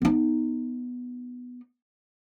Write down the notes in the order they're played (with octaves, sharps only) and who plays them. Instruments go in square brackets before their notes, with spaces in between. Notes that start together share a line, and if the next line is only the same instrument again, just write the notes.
[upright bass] B3 D#4